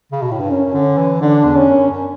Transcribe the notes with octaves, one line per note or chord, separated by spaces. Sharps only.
C#3
B2
A2
G2
F#2 C#4
D3
E3
D3 D4
E2
C#4
F#2
F#2